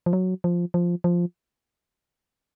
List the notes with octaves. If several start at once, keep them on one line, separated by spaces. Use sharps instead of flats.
F3
F#3
F3
F3
F3